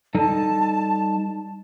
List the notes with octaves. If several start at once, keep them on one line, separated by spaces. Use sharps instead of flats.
G3 D#4 A4 A5